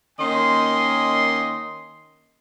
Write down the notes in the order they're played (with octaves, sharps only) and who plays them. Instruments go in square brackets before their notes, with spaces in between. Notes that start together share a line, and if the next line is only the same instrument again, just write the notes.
[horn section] D#3 A#3 C#4 D#5 G#5 C6